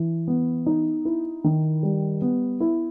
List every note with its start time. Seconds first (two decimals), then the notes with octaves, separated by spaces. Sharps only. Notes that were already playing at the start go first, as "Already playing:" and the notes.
Already playing: E3
0.28 B3
0.66 D#4
1.05 E4
1.44 D#3
1.83 G3
2.22 B3
2.60 E4